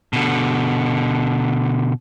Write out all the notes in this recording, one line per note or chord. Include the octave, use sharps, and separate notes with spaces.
B2 D3